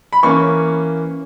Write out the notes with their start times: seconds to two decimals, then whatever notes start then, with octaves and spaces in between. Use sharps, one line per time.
0.13 B5
0.23 E3 A#3 C#4 C#6